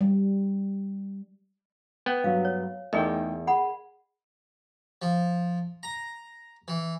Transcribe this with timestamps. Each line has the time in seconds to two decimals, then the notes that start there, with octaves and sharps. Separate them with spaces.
0.01 G3
2.06 B3 G5
2.24 G2 F#3 F5
2.45 C#5
2.93 E2 A3 D#4 G#4 A#4 D#5 G5
3.47 G#4 F#5 B5
5.02 F3
5.83 A#5
6.68 E3